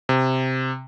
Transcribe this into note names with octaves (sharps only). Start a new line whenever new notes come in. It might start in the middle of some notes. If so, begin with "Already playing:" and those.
C3